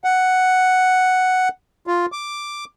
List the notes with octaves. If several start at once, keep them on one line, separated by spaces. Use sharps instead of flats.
F#5
F4
D6